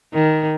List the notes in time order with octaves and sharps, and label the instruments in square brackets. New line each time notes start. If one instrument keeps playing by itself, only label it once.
[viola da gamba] D#3